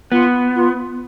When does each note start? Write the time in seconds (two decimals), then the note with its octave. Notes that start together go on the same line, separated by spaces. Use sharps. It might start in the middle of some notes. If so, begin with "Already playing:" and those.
0.12 B3 F4
0.55 F4